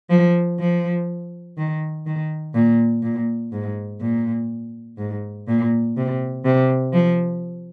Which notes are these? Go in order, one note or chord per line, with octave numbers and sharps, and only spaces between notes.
F3
F3
D#3
D#3
A#2
A#2
G#2
A#2
G#2
A#2
C3
C3
F3